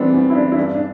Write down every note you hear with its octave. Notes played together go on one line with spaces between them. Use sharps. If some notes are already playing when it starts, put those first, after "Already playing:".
Already playing: E3 G3 B3 C4 D4
E2
E4
G3 D4
E4
G2 D4
D4